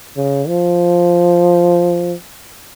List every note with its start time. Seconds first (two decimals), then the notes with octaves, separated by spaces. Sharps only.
0.17 C#3
0.48 F3